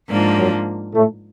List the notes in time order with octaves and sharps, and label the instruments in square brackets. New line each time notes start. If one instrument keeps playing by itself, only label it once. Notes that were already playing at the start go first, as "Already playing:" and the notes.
[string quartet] G#2 F3 A#3 D4
[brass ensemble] F#2 F#3
A2 A3